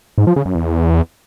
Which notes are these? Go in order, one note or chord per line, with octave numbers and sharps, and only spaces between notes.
G#2
F3
C#3
F#2
E2